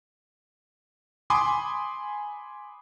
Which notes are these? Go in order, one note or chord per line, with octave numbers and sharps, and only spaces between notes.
G#5 B5 C6 D6 D#6